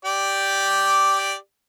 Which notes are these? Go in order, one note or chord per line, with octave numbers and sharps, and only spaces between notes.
G4 D5